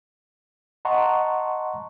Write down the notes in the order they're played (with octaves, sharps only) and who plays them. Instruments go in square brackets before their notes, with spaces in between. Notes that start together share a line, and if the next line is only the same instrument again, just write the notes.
[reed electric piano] D#5 F#5 A5 A#5 C6 C#6